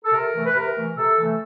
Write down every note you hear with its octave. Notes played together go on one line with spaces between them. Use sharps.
A4
C3 A#4
E3 A3
B4
C3 A#4
E3 A3
C3 A4
E3 A3